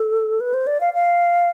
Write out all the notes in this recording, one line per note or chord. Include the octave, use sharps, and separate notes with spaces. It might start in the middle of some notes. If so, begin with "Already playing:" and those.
Already playing: A4
B4
C5
D5
F5
F5